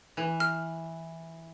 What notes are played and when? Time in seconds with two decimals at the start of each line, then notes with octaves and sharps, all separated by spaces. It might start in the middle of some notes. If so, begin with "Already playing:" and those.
0.17 E3
0.40 F6